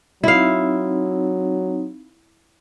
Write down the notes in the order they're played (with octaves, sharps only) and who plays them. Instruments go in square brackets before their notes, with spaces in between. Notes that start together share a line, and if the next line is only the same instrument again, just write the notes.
[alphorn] F#3 [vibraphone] C4 D#4 [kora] E4 F5